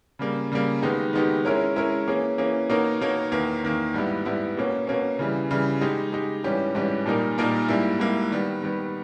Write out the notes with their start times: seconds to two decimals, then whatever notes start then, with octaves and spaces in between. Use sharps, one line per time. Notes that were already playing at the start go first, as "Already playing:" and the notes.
0.19 C#3 G3 A#3
0.52 C#3 G3 A#3
0.82 D#3 G#3 B3 D#4 G4
1.13 D#3 G#3 B3 D#4 G4
1.45 G#3 C#4 E4 A#4 C#5
1.76 G#3 C#4 E4 A#4 C#5
2.07 E3 A#3 C#4 G#4
2.38 E3 A#3 C#4 G#4
2.69 B2 A#3 D#4 A#4 C#5
3.01 B2 A#3 D#4 A#4 C#5
3.32 E2 D#3 A#3
3.63 E2 D#3 A#3
3.94 G#2 G3 B3 E4
4.25 G#2 G3 B3 E4
4.57 B2 A#3 C#4
4.87 B2 A#3 C#4
5.19 C#3 E3 G3
5.51 C#3 E3 G3
5.81 G#3 D#4 G4
6.12 G#3 D#4 G4
6.44 G#2 E3 G3 C#4 G4
6.75 G#2 E3 G3 C#4 G4
7.06 A#2 G3 A#3 D#4 A#4
7.38 A#2 G3 A#3 D#4 A#4
7.68 G#2 G3 A#3 E4
7.99 G#2 G3 A#3 E4
8.31 D#3 G3 B3
8.62 D#3 G3 B3